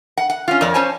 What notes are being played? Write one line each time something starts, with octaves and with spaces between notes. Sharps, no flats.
F#5
F#5
C#4 F4
F2 A#4 C#5 D5
C#4 C5 C#5 G#5 A5